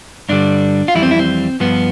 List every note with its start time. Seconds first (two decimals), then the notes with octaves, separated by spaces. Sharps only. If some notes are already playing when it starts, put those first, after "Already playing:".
0.29 G2 D3 G3 D4
0.88 F4
0.95 F2 E3 G3 E4
1.03 C4
1.11 E4
1.19 C4
1.60 G2 F3 B3